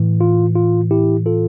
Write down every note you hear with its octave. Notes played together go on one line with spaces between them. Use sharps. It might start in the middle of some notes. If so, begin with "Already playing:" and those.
Already playing: A2 E3
F4
F4
E4 G4
F4 A4